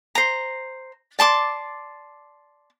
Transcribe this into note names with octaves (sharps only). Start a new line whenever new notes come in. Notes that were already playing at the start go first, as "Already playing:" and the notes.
C5 A#5
D5 A5 C6 D6